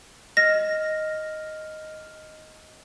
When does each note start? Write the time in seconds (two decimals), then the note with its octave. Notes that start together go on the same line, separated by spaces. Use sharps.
0.37 D#5 F6 A#6